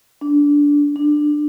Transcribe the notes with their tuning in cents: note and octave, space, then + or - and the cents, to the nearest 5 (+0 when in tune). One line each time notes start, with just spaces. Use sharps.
D4 -15
D4 +15